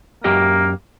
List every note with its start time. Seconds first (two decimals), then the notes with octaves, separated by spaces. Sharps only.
0.24 F#2 A#3 G4 D#5